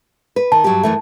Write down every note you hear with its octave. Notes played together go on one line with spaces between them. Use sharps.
B4
D#3 A5
G2 F#3 G4
F#2 E3 A3